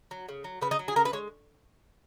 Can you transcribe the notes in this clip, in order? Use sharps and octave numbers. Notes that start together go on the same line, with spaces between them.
F#3
C#3
F#3
C#3 B4
D#4
F#3
G#4
C#3 A#4
B4
G#3 C#5